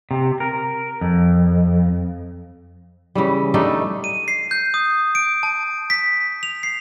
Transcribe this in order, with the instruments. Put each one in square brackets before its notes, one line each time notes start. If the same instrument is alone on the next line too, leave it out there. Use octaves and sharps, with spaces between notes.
[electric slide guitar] C3
A#4
F2
[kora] C#3 E3 G3
G3 A3 D4 D#4
[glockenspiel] D#7
C7
G6
D#6
D7
A5
B6
F7
C7